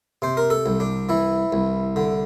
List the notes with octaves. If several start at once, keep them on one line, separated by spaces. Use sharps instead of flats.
C3 C5
A#4
A4
C2
D4
E3 E4
C2
D3